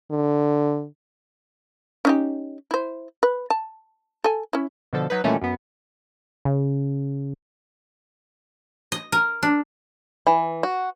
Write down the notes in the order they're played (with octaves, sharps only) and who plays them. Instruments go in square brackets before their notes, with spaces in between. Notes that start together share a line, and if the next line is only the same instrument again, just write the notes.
[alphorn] D3
[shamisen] C#4 D#4 G4
E4 C5
B4
A5
A4 G#5
C#4 E4
[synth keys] B2 D3 F3 A4
F#3 D#4 B4
A#2 D#3 E3 G3 A3 C#4
F#2 B3
[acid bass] C#3
[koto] D#5
A#4
D4
[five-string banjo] E3
F#4